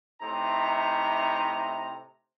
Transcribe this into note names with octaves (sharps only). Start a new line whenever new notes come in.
A2 C3 D#4 A#5